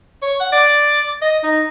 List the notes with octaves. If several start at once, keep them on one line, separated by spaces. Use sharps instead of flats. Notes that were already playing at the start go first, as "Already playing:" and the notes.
C#5
F#5
D5
D#5
D#4